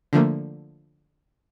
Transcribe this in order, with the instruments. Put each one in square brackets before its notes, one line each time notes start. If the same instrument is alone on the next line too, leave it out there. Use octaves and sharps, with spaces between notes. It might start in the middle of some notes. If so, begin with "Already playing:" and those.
[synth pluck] D3 F3 A3 A#3